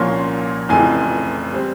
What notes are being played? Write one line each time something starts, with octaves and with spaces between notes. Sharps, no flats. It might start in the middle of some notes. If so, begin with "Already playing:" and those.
Already playing: C2 A#2 F3 A#3 C#4 C6
F1 F2 C#3 E3 G#5
G3 C4